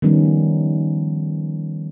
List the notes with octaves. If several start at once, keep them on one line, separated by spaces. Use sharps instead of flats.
D#3 F3 G3 B3 C#4 D#4